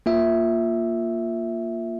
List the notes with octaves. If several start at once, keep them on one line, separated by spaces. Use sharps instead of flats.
A#3 F4 E5